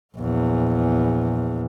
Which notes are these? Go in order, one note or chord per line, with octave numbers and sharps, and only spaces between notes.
A#1 E2